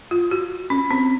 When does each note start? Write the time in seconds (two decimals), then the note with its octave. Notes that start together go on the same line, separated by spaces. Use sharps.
0.11 F4
0.31 F#4
0.70 C#4
0.91 C4